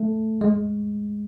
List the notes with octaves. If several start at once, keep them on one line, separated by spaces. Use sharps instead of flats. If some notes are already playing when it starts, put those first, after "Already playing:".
Already playing: A3
G#3